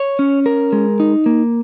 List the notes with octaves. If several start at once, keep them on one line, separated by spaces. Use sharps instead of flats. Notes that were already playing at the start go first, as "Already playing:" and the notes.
Already playing: C#5
C#4
A#4
G#3
D#4
A#3